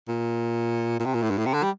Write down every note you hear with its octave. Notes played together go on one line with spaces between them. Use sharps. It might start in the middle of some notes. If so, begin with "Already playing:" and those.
A#2
A#2
C3
A#2
A2
G2
A2
C3
D3
G3